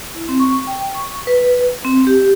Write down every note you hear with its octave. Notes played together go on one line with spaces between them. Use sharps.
E4
C4
C#6
G5
C#6
B4
C4
G4